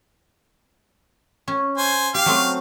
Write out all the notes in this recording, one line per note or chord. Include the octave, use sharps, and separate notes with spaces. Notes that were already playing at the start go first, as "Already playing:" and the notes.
C#4
C5 G#5
G4 F5
F#3 A3 C4